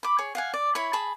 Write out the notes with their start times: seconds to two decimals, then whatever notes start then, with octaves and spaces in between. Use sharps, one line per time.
0.03 B5 D6
0.18 G#4 C#5
0.35 F5 F#5 G#5
0.54 D5
0.75 E4 C#5 B5
0.93 G#4 A5 B5